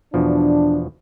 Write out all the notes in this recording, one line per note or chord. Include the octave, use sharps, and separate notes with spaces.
E2 B2 F3 D4